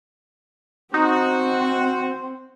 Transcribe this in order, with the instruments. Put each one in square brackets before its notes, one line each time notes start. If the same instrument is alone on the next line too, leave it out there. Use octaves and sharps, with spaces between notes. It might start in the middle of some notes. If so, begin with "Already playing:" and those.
[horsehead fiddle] C4 [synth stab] D#4 [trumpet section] F#4 [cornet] C5